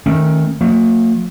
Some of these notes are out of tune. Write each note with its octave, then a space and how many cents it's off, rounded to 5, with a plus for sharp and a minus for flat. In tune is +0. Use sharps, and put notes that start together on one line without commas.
D#3 +10 A3 +0 C#4 -25
F#3 -45 A#3 -45